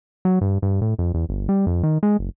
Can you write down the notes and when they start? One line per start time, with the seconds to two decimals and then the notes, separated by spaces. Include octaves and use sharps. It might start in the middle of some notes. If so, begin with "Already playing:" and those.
0.25 F#3
0.41 G2
0.62 G2
0.81 A2
0.99 F2
1.14 E2
1.29 G1
1.49 G3
1.66 F2
1.83 D#3
2.03 G#3
2.19 F#1